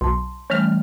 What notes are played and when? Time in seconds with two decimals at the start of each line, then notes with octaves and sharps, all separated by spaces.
0.01 B1 A5 C6
0.50 E3 G3 A3 C#4 F6